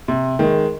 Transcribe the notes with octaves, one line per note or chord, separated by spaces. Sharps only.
C3
D#3 G#3